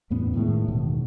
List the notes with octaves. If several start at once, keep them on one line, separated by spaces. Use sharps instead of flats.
E2 A2 B3 C#4
A2 D#3 G#3
E1 B2 D#3